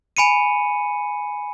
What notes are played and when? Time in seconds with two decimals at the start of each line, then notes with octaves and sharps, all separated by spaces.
0.17 G#5 B5 C#7 D#7